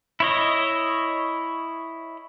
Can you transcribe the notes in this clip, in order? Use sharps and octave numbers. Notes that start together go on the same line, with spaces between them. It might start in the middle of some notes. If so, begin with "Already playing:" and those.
E4 C#5 D#5